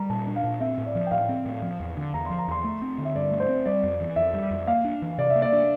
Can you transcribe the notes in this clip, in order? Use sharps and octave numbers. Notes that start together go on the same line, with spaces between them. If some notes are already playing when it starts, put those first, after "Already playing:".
Already playing: G3 A#5
A#2 A5
D4
F5
A#2
C4 E5
A2
D5
F3
G5
A2 F5
C4
A2
F3
E2
D3
E2 A#5
F3 C6
A#5
E2 C6
A3
C4
D3
E5
G2 D5
A3
C5
C4
G3 D5
F2
E3
F2 E5
G3
F2
A#3 F5
D4
E3
C3 D5
E5
A#3
D5
D4